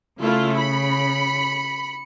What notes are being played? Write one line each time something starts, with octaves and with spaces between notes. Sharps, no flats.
C#3 A3 E4 F4 F6
B5 C#7